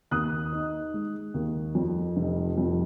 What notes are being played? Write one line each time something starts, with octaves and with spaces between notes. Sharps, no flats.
D#2 D#6 F#6
D#4
G#3
D#2
F2
F1
F2